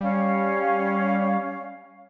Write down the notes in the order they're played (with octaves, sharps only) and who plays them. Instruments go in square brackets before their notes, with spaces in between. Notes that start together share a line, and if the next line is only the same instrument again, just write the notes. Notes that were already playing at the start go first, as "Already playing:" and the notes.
[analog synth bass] G3 [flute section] C#4 F5